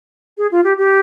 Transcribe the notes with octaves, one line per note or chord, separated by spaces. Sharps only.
G#4
F4
G4
G4